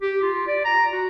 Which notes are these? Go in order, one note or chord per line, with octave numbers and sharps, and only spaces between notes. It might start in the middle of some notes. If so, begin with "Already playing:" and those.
G4
F4
D5
A#5
F#4